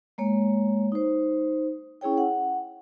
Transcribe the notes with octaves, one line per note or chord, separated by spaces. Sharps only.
G#3 A#3 C#5
D#4 C5
C#4 E4 G#4 C#5 G5
F#5